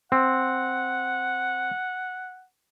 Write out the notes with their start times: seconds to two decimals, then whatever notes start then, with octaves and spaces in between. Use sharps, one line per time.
0.12 C4 F#5